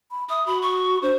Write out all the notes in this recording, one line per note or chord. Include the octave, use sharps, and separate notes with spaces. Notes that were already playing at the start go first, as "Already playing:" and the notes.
B5
E5 D#6
F#4 B5
C#6
D4 C5